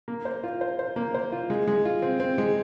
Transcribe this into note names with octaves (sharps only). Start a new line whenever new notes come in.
A#3
C5
F4
C5
C5
A#3
C5
F4
G#3
G#3
F4
C4
C4
G#3